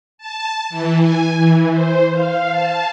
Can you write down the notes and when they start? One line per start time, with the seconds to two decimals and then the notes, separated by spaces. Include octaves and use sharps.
0.18 A5
0.70 E3
1.01 G#5
1.38 E3
1.70 C5
2.13 F5
2.51 A5